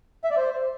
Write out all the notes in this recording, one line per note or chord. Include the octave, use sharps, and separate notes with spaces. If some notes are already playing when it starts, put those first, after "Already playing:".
E5
D5
C5